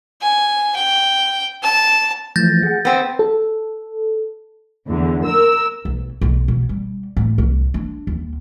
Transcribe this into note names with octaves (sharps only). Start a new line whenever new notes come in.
G#5
G5
A5
E3 F3 A3 G6 A6 A#6
G#4 F#5
B3 C4 F#5
A4
E2 D3
A#4 E6
B1
B1
B2
G3
A2
C2
D4
D#2